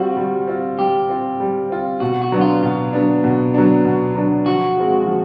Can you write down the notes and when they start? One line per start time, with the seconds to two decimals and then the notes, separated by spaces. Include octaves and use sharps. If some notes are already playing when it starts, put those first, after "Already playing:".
Already playing: G3 C4 F4 F#4
0.16 G3
0.47 C4 F4
0.78 G3 G4
1.09 C4 F4
1.40 G3
1.70 C4 F4
2.00 B2 F#4
2.22 F#4
2.32 F#3 B3 D4
2.41 F4
2.62 B2 F4
2.93 F#3 B3 D4
3.24 B2
3.54 F#3 B3 D4
3.85 B2
4.15 F#3 B3 D4
4.46 F3 F#4
4.77 G#3 C4 F4 G#4
5.07 F3